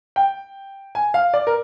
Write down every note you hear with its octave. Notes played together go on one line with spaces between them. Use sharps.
G5
G#5
F5
D5
A#4